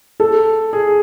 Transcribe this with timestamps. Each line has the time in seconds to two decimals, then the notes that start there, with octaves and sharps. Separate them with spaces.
0.20 A4
0.73 G#4